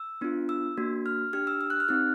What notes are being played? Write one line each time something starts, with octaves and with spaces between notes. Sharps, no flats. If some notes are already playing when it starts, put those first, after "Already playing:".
Already playing: E6
B3 D4 F4
E6
A#3 D4 F#4
F6
D4 G4 F6
E6
E6
F#6
F6
C4 D#4 G4 F#6